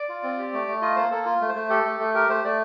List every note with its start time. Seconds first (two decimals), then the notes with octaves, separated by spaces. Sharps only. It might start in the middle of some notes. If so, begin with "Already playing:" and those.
Already playing: D5
0.09 F4
0.23 C4
0.38 G4
0.53 A3
0.67 A3
0.82 F4 D#5
0.96 A#3 C5
1.11 A#3 A4
1.26 F4
1.41 A3
1.49 C5
1.55 A3
1.70 G4 A4
1.85 A3
1.99 A3
2.14 G4 A#4
2.29 A3 C5
2.44 A3 D5